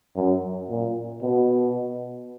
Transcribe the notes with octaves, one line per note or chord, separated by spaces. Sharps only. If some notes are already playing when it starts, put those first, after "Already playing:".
F#2
A#2
B2